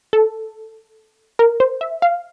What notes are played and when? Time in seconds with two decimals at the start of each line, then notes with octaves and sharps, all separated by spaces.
0.13 A4
1.39 A#4
1.60 C5
1.81 E5
2.02 F5